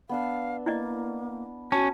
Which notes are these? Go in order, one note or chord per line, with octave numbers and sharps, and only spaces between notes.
B3 D4 F5 E6
A#3 E4 D5 D#5
C#4 F#4 A5